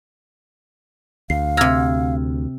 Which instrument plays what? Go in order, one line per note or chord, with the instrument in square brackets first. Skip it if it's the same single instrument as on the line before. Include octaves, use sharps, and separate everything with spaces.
[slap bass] D2 [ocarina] F5 [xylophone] C7
[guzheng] C3 A#5 [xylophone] E6 F6 G#6